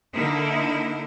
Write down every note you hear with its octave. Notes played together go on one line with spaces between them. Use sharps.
D3 A#3 D#4 E4 A#4